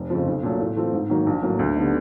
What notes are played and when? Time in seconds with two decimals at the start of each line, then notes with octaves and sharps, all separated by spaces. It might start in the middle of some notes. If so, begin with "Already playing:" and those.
Already playing: F1
0.10 F2 C#3 F3
0.27 B1
0.43 A#2 F#3 A3 C#4
0.60 A2
0.77 E3 A3 C4 F4
0.93 G#2
1.10 D#3 F#3 A#3
1.26 A#1
1.42 A2 F#3 A#3
1.59 D2
1.76 D3 G3 B3 D#4